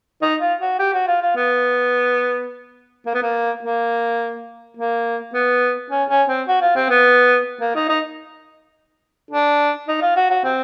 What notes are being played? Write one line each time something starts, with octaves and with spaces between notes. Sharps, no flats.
D#4
F4
F#4
G4
F#4
F4
F4
B3
A#3
B3
A#3
A#3
A#3
B3
C#4
C#4
C4
F#4
F4
C4
B3
A#3
D#4
D#4
D4
D#4
F4
F#4
F#4
C4